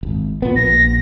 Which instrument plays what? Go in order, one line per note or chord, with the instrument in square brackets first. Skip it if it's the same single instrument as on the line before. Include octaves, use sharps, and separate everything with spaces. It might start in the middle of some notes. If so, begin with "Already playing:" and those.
[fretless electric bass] D#1 G#1
A#2 B3
[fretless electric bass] A#1 [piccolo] A#6